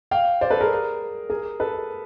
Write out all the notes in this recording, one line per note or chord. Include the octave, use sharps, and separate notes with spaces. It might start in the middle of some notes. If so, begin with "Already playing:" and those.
F5 G5
C5 D5
A4 B4
G#4 A#4
G#4 A#4
A4 B4